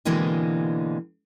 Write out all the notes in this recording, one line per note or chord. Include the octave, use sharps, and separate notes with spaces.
B2 D3 E3 G#3 A#3 C4